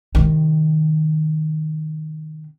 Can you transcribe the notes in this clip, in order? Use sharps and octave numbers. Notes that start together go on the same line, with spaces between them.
C3 D#3